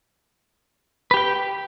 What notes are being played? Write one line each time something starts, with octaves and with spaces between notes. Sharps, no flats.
G4 B4 G5